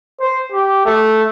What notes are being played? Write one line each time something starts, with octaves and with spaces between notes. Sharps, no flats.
C5
G4
A3